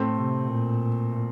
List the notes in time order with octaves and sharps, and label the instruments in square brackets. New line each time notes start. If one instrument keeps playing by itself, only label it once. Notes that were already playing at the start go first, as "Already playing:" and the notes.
Already playing: [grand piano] A2 A3 C4
[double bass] C3
A#2